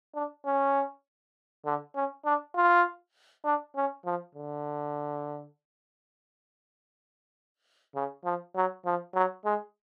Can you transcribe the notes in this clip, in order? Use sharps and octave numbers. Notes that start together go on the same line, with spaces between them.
D4
C#4
D3
C#4
D4
F4
D4
C#4
F3
D3
C#3
F3
F#3
F3
F#3
G#3